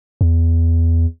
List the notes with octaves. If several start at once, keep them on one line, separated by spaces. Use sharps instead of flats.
E2